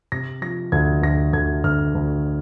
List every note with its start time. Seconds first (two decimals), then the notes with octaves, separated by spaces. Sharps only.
0.12 C3 A#6
0.42 F3 A#6
0.72 D2 G#6
1.02 D2 A#6
1.33 D2 G#6
1.64 D2 F6
1.95 D2